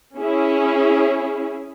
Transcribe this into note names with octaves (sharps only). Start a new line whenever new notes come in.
C#4 E4 G#4